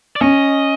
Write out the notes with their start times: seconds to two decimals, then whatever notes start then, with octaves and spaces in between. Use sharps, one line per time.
0.16 D5
0.21 C#4 D#5